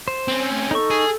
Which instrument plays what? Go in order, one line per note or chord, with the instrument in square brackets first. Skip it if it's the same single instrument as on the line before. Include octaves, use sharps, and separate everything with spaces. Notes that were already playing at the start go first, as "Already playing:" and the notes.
[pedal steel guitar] C5
[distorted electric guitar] C4 C#4
[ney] A3
[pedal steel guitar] D#4 C#6 [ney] A4
[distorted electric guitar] G#4